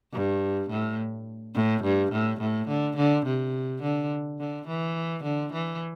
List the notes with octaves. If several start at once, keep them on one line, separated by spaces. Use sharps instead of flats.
G2
A2
A2
G2
A2
A2
D3
D3
C3
D3
D3
E3
D3
E3